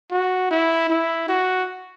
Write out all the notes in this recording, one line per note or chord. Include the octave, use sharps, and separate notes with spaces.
F#4
E4
E4
F#4